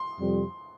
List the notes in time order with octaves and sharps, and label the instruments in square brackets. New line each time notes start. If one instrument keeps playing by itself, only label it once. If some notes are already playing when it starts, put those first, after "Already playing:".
Already playing: [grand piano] C6
[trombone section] F2 C3 G3